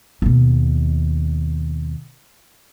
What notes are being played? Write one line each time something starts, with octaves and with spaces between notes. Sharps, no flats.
D#2 B2